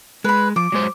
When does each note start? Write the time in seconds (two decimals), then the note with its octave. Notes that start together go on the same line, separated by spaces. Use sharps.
0.24 G#3 B4 B5
0.56 F3 D6
0.72 F#3 G#3 C5